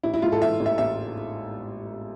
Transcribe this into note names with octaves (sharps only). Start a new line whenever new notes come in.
A1 E4
E4
G#2 F4
A4
E3 E5
A1
E5
A1 E5